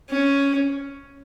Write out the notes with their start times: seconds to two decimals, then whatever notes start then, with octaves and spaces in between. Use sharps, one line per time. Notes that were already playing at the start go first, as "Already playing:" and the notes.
0.10 C#4